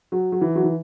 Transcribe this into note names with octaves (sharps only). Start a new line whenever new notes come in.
F#3
F#3
E3
F#3
E3